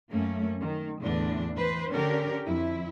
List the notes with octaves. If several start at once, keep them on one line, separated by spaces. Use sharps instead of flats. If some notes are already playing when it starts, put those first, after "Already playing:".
F#2 A3 A#3 C#4
D#3
E2 A2 D3 D4
E3 B4 C5
D3 C#4 D4 G4 A#4
F2 E4 E5